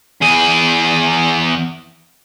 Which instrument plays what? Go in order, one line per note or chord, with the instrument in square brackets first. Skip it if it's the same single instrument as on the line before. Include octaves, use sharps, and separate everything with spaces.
[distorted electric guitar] E2 G#4